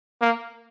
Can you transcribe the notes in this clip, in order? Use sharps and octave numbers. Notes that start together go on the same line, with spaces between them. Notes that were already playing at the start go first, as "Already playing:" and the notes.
A#3